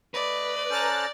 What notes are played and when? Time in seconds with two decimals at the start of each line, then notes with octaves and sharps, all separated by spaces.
0.14 A3 B4 D5 D#5
0.70 C#4 A4 C5 A#5 F#6 A6